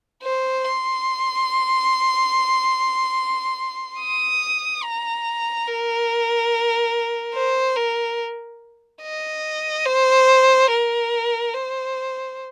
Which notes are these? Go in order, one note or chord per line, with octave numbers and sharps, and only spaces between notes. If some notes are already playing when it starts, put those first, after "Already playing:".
C5
C6
D#6
A#5
A#4
C5
A#4
D#5
C5
A#4
C5